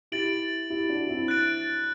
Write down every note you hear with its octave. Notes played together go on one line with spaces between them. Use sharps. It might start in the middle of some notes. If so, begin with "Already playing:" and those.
E4 G4 A6 D7 F#7
E4 G4
D4 F#4
C4 E4
F#6 A6 D7